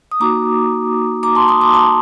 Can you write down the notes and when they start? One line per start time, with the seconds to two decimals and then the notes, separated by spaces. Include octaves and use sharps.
0.12 D#6
0.20 A#3 D#4 F#4 A#5 D6
1.23 A#5 D6
1.35 A5 C6
1.48 C6 D#6
1.61 A#5 D6
1.74 A5 C6